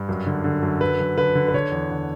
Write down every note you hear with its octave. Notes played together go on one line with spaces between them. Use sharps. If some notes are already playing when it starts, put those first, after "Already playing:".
Already playing: G2
F#2
D3
D3
F#2
F#2 B4
F#2
D3 B4
D3
B4
D3 C#5
E2
D3